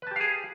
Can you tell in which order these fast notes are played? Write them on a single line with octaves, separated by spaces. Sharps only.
B4 A5 G4 F5 G#4